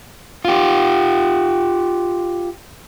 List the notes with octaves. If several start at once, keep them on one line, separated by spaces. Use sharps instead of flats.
F4 G4